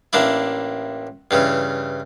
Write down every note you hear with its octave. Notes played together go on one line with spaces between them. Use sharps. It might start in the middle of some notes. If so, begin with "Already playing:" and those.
A1 A#3 D4 E4
G2 C#3 E3